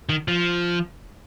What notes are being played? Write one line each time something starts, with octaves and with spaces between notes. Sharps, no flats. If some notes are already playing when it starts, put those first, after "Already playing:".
D#3
F3